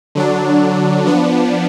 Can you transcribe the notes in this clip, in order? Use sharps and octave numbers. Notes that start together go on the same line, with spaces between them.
D3 F#3 D4
F3 B3 D4